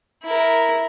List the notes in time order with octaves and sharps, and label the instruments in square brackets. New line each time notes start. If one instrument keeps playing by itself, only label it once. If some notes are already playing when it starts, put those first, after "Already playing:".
[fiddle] E4 A#4